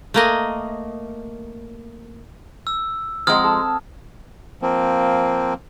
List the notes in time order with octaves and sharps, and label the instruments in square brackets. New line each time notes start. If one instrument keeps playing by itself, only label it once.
[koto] A3 A#3 D#5
[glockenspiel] E6
[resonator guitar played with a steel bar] F3 G#3 [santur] C4 F#5 A#5 [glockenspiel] D#6 F6 G#6
[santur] A4
[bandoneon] F3 A#3 C4